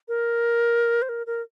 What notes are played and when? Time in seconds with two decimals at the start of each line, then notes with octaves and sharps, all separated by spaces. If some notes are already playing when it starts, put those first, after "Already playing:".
0.08 A#4
1.02 C5
1.09 A#4
1.27 A#4